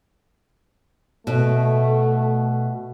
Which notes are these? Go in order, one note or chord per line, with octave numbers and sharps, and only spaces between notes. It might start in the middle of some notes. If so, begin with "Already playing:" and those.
B2 A3